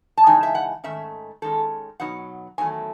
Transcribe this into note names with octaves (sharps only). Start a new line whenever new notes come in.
A5
C#3 E3 G#3 D#4 G#5
E5
F#5
G#2 D#3 A3 C#4 E5
D#3 G#3 C#4 A4
B2 F#3 B3 D#4 F#5
E2 D#3 F#3 A3 G#5